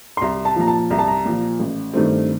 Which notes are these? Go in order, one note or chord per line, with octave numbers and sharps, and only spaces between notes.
C6
C2 A#5
A5
A#2 F3 A#5
A5
C2 A#5
A5
A#5
A#2 F3
A1
G2 D#3 A3 C4